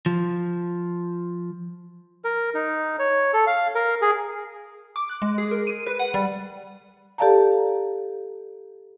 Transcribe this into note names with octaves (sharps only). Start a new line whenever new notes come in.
F3
A#4
D#4
C#5
A4
F5
A#4
G#4
D6
F#6
G#3
G#4
A#4
D#7
B4
F#5
G3
G4 A4 D5 F5 A5 A#5